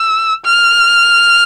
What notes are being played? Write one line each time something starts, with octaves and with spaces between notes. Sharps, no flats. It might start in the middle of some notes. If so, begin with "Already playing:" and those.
Already playing: E6
F6